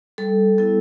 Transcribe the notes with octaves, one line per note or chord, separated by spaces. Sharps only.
G3 A4
B3 E4 A4